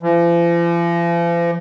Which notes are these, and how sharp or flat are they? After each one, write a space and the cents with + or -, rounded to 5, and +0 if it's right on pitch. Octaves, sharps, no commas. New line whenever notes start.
F3 -45